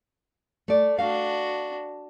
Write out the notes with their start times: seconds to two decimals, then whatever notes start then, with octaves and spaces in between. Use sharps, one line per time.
0.68 A3 D5
0.99 D4 F#4 F5